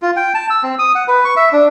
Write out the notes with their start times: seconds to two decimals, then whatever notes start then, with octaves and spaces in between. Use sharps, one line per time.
0.02 F4
0.17 G5
0.35 A5
0.50 E6
0.63 C4
0.79 D#6
0.95 F#5
1.08 B4
1.25 C#6
1.37 E5
1.52 D4